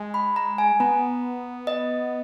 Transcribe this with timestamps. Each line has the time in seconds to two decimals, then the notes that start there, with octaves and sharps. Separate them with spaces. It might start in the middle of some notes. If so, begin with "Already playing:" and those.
Already playing: G#3
0.14 B5
0.36 A#5
0.58 G#5
0.80 B3 A#5
1.67 D#5